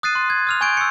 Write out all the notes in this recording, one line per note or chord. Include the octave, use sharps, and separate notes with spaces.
D#6 F#6 A6 C7 D#7
C6
G#6
D#6 F6 F7
G#5 C#6 G6 G#6 D7
E6 C#7